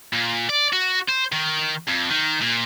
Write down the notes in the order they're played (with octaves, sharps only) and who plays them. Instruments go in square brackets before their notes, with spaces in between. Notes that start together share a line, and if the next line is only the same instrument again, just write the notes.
[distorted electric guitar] A#2
D5
F#4
C5
D#3
F2
D#3
A#2